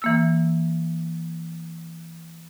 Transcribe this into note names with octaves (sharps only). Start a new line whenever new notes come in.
E3 A#3 E6